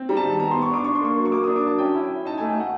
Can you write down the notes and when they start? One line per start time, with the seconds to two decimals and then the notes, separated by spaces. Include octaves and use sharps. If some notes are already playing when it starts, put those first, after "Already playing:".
Already playing: C4
0.09 G3 A#5
0.17 A5
0.24 D#3
0.39 B3 A#5
0.51 C6
0.55 B3
0.62 C#6
0.71 D4 D6
0.84 D4 C#6
0.95 C6
1.01 A#3 C#6
1.17 F#3
1.25 C#6
1.32 A#3 D6
1.44 D#6
1.47 D4
1.56 D6
1.63 F#3 A5
1.78 C#4 G5
1.94 E4
2.10 C#4
2.25 D#4 A5
2.38 A3 G#5
2.48 G5
2.56 A3 F#5